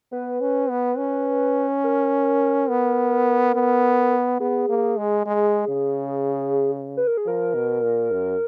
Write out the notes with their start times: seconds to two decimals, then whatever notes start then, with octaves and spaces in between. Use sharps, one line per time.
0.12 B3 B4
0.41 C#4
0.70 B3
0.98 C#4
1.84 A#4
2.69 B3
3.55 B3
4.40 B3 G#4
4.69 A#3
4.98 G#3
5.26 G#3
5.68 C#3
6.97 B4
7.07 A#4
7.17 G#4
7.26 F3 A#4
7.54 B2
7.83 A#2
8.11 F#2